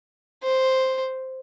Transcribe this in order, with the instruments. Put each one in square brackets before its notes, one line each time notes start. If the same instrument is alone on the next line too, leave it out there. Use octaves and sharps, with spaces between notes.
[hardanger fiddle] C5